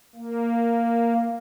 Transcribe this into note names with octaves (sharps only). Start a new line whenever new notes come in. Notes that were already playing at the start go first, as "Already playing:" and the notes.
A#3